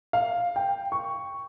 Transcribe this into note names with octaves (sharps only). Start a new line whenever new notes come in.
F5
G5
C#6